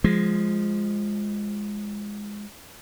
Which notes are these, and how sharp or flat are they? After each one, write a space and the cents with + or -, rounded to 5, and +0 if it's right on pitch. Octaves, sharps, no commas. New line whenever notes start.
F3 +0 G#3 -5